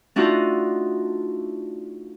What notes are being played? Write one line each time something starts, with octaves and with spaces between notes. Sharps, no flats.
A3 D4 D#4 F4 F#4